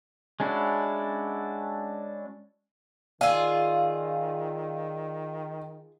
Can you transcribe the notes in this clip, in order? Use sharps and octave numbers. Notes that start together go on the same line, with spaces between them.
G#3 C#4 D4 E4 F#4
D#3 F4 G#4 D5 F5 E6